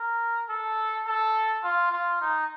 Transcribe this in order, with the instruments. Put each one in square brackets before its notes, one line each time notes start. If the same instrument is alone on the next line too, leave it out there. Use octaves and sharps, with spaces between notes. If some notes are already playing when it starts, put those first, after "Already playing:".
Already playing: [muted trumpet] A#4
A4
A4
F4
F4
D#4